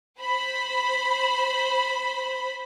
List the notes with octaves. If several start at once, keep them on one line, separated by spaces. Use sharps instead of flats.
C5 B5